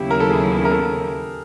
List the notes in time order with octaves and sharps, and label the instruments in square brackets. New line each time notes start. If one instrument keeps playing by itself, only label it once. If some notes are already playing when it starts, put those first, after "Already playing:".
Already playing: [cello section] D#2 C#3 F#3 B3 E4 [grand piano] G4
[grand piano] A#4
A4
G#4
A#4
A4